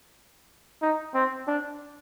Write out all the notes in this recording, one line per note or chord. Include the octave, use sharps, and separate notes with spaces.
D#4
C4
D4